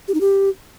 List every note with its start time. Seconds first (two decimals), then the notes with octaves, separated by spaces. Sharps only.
0.08 G4
0.14 D#4
0.21 G4